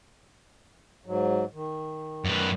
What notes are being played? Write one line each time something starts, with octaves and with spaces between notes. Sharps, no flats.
G#2 F#3
D#3
F#2 B4